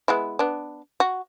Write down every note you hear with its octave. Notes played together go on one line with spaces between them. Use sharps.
G#3 B3 E4
B3 D4
F#4